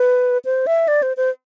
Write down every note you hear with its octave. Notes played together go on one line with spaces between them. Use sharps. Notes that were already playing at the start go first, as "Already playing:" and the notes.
Already playing: B4
C5
E5
D5
C5
C5